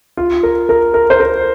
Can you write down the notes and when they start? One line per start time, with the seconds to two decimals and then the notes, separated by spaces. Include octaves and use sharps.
0.17 F4
0.43 A#4
0.69 A#4
0.94 A#4
1.10 C5
1.20 A#4